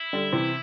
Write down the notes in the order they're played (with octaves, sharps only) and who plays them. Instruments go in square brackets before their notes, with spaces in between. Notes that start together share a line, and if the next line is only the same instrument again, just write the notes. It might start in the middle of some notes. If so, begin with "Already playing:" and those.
Already playing: [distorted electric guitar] E4
[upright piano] D3 G3
C3 E3